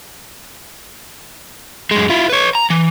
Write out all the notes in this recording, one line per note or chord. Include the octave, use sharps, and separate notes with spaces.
F#2 G#3
E4 F4
B4 C#5
A#5
E3